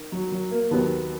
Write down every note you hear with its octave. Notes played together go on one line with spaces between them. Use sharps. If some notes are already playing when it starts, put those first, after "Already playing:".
Already playing: D#3
F#3
F#3
A#3
D#2 D#3 F#3 B3